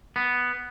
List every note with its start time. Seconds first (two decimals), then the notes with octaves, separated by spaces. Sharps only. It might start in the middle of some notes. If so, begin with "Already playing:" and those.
0.16 B3